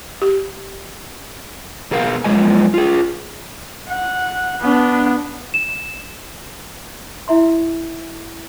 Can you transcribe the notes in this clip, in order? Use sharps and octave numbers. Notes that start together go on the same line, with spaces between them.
G4
B2 G#4 A#4 F5
F#2 F3 G#3 D#5 G#5
F4 G#4
F#5
B3 D4
E7
E4 E5 C6